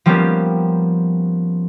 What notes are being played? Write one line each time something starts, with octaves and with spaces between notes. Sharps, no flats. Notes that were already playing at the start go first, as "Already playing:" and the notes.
F3 G3 A#3 B3 C#4 G4